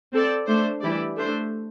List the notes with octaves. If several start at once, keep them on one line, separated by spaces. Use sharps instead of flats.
C4 A4 D5
A3 D4 C5
E3 G3 E4 G4 D5
A3 D4 C5